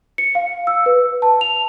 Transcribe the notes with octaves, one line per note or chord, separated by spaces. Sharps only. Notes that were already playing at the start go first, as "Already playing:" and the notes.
C#7
F5
E6
B4
A5
F7